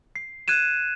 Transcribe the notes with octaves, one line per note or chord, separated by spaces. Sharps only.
C7
F#6 G#6 D#7 E7